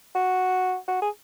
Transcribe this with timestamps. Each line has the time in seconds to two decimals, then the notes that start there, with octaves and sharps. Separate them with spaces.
0.15 F#4
0.88 F#4
1.02 G#4